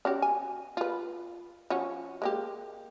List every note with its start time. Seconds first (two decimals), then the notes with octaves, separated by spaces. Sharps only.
0.05 C#4 F#4 G4
0.22 G#5
0.77 F4 B4
1.70 F3 C#4 F#4
2.22 G#3 A#3 G4